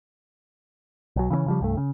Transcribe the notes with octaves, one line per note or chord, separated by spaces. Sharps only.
B1 F#3
C#3 E3 A3 C#4
C#3 F3 G3
C2 G2 A3
C#3